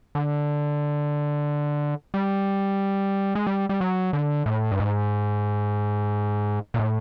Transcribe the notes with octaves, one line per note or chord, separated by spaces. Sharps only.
D3
G3
G#3
G3
G3
F#3
D3
A2
G2
G#2
A#2
A2